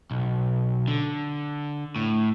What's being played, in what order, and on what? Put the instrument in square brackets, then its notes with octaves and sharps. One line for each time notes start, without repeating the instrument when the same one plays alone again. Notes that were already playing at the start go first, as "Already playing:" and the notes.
[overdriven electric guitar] B1
D3
A2